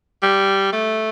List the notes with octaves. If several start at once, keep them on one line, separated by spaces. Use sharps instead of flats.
G3
A3